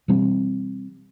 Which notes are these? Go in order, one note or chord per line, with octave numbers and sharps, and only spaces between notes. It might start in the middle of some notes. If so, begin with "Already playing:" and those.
B2 E3 G3 C4